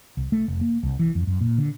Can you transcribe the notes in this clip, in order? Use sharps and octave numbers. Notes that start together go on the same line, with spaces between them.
C2
A3
F1
A#3
C2
E3
F2
F#2
A#2
D3